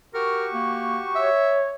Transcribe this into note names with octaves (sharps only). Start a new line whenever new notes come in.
F#4 G4 A#4 C#6
A#3
C#5 E5